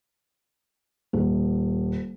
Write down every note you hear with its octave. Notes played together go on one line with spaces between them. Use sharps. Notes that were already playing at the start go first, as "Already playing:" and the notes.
D#1